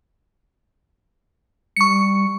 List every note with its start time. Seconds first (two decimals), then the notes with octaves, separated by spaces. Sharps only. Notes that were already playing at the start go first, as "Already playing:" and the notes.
1.77 G3 C#6 C#7